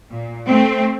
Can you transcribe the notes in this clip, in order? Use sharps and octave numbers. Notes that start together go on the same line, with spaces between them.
A#2
A3 C4